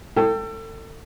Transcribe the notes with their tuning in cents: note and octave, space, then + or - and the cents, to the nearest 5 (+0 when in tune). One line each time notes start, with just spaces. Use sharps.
A4 +30 G5 +0